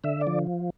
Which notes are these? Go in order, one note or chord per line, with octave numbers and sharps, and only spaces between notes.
D3 E5
D5
F3